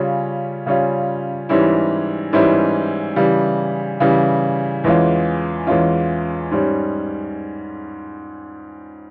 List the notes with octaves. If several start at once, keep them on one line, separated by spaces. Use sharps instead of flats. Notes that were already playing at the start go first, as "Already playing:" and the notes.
Already playing: C#3 G3 C#4 F4
C#3 G3 C#4 F4
G#2 E3 G3 C#4 E4
G#2 E3 G3 C#4 E4
C#3 E3 G3
C#3 E3 G3
E2 E3 G#3 C#4 F4
E2 E3 G#3 C#4 F4
G#2 G3 C#4